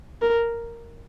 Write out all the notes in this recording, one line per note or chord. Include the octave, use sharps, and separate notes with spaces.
A#4